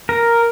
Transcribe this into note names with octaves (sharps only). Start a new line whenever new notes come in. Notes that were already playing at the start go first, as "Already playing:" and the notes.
A#4